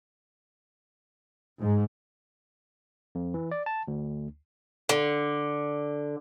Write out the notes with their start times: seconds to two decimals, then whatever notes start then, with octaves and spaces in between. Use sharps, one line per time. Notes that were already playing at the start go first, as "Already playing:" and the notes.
1.59 G#2
3.15 F2
3.34 E3
3.51 D5
3.66 A5
3.88 D2
4.89 D3